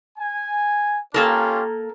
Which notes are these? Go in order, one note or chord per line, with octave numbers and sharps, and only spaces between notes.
G#5
A#3 C#4 F4 G4 A4 A#4